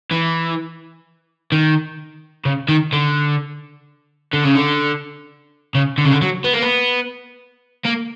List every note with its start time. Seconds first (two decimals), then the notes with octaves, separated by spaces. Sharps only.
0.11 E3
1.52 D#3
2.45 C#3
2.69 D#3
2.93 D3
4.33 D3
4.44 C#3
4.55 D3
5.75 C#3
5.98 D3
6.05 C#3
6.12 D3
6.22 F#3
6.45 B3
6.54 A#3
6.62 B3
7.85 A#3